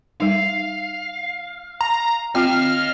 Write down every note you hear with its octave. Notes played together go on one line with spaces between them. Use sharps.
G3 D#4 F5
A#5
C4 F4 D#5 F5 G5 F6